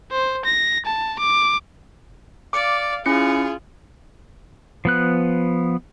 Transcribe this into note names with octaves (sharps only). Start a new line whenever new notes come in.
C5
A#6
A5
D6
D5 F5 D6 C#7
C#4 E4 F4 G#4 C#7
F3 B3 F#6